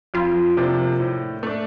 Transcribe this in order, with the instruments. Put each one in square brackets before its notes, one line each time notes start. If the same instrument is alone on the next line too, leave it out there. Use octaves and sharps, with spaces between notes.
[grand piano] F2 [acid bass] F4
[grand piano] C3 F3 A#3 D4
A2
A3 D4